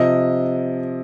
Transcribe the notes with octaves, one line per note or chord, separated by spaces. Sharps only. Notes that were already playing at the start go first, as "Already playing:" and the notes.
Already playing: C3 F3 D#5